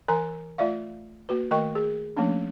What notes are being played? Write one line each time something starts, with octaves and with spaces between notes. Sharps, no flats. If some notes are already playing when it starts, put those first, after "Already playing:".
E3 A#4 G#5 A#5
A3 F4 D5 E5 F5
A#3 F#4 B4
D#3 A3 A#4 D#5 G5 C#6
G#4
F3 A3 A#3 C#4 D4